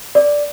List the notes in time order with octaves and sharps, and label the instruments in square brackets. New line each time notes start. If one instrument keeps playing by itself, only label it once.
[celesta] D5